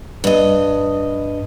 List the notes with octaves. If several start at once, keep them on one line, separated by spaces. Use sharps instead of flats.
G2 D#5